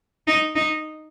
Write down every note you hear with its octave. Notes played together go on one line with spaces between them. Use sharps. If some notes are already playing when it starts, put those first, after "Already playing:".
D#4
D#4